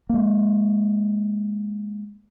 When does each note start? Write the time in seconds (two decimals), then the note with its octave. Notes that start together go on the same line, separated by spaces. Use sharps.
0.09 G#3 A#3